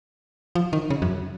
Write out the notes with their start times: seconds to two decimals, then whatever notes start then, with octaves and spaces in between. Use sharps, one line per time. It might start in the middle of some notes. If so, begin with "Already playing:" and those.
0.55 F3
0.73 D#3
0.90 C#3
1.02 F#2